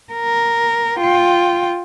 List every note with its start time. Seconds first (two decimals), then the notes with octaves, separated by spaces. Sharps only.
0.13 A#4
0.99 F4 G5